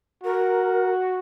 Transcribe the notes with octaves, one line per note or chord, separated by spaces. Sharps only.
F#4 A#4